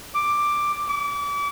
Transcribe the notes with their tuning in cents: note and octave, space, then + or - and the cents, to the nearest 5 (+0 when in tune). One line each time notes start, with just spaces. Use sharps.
D6 +5
D6 -35